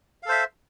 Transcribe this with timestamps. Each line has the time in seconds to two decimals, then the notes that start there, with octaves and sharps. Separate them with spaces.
0.23 F5
0.26 A4
0.29 C5
0.32 E5